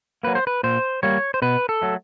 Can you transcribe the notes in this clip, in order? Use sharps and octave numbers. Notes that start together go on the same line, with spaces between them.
F#3 A#3 B4
C5
B4
A#2 C5
G3 A#3 C#5
C5
B2 B4
A4
F#3 A3